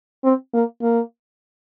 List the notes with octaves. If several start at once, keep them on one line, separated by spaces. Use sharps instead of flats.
C4
A#3
A#3